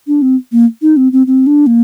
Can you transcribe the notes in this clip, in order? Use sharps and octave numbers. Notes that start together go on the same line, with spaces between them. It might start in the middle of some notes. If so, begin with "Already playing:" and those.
D4
C4
A#3
D#4
C4
C4
C4
D4
A#3